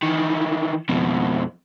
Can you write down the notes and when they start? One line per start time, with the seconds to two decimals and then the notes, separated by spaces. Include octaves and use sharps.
0.03 D#3 E3
0.89 F2 B2